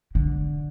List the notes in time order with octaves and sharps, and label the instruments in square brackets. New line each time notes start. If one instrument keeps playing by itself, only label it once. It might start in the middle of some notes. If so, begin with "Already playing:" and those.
[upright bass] D3